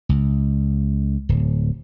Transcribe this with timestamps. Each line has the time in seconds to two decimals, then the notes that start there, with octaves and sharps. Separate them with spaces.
0.09 C#2
1.29 D1